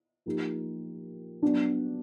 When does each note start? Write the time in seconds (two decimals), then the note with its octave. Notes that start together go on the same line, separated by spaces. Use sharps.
0.26 F3 A#3 D#4 G4
1.42 F#3 B3 D4